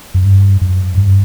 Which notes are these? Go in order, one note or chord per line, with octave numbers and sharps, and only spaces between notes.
F#2
G2
F#2
G2